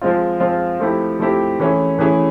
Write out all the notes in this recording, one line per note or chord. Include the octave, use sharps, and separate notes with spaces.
F3 G#3 C4 F4
F3 G#3 C4 F4
F3 A3 C4 E4 G4
F3 A3 C4 E4 G4
E3 A3 C#4 E4 G#4
E3 A3 C#4 E4 G#4